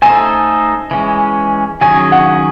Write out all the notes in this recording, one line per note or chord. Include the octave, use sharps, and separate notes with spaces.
A3 D#4 A4 C5 G#5
E3 G#3 C#4
D#3 F#3 C#4 G#4 C#5 G#5
F#5